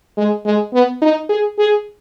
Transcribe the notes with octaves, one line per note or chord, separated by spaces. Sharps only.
G#3
G#3
B3
D#4
G#4
G#4